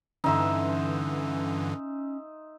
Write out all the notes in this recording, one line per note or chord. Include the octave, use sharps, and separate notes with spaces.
G2 D3 E3 C#4 D#4 E5 C6